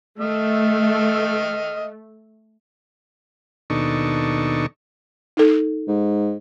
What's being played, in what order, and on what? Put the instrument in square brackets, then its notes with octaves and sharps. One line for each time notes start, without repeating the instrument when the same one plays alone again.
[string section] A3 [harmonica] D#5 F6
[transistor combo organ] D#2 B2 D4 D#4 A4 C#6
[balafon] D#4 A4
[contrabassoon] G#2